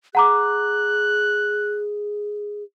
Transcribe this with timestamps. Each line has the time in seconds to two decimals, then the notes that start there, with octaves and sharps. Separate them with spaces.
0.15 G#4 F#5 A#5 D6 F#6